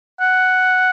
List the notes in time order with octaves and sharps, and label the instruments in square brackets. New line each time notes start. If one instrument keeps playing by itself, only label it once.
[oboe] F#5